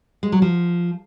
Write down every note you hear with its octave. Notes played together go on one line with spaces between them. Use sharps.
G#3
F#3
F3